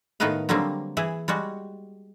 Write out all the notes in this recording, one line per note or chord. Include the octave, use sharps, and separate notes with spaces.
A2 D#3 B3 D#4 B4 F5
D3 F#3 G3 A#3 C4
E3 E4 G#4
G3 G#3 F#4